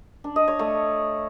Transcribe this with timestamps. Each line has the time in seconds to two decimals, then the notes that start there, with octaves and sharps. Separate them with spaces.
0.24 D4
0.36 D#5
0.48 C#5
0.59 A3